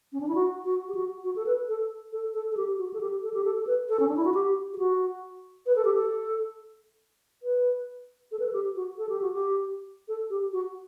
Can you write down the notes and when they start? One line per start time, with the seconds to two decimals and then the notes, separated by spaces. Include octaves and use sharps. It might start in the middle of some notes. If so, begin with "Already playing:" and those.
0.13 C#4
0.20 D4
0.28 E4
0.35 F#4
0.65 F#4
0.89 G4
0.95 F#4
1.24 F#4
1.36 A4
1.46 B4
1.68 A4
2.13 A4
2.34 A4
2.52 A4
2.57 G4
2.78 F#4
2.94 A4
3.01 G4
3.23 A4
3.34 G4
3.45 A4
3.61 A4
3.67 B4
3.89 A4
4.00 C#4
4.08 D4
4.16 E4
4.25 F#4
4.34 G4
4.73 G4
4.78 F#4
5.66 B4
5.76 A4
5.85 G4
5.94 A4
7.43 B4
8.32 A4
8.39 B4
8.47 A4
8.53 G4
8.76 F#4
8.98 A4
9.09 G4
9.22 F#4
9.33 G4
10.08 A4
10.30 G4
10.53 F#4